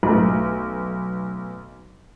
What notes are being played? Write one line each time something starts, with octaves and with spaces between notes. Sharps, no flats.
B1 A3